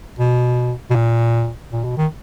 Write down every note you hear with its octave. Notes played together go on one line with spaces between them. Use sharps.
B2
B2
A#2
A#2
B2
D#3